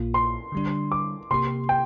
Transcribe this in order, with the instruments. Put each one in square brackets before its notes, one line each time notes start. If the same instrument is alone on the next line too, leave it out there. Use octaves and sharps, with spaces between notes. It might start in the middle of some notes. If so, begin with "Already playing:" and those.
Already playing: [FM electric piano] A#1 A#2 A#3 F4
[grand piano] C6
[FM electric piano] D3 G3 D4
[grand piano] D6
[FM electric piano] C3 A#3 G4 [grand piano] C6
[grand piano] G5